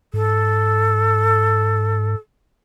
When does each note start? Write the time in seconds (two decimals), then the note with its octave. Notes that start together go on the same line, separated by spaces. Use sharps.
0.14 G#2 A4